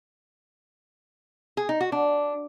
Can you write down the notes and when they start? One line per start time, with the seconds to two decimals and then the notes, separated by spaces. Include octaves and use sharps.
1.57 G#4
1.69 D#4
1.81 F#4
1.92 D4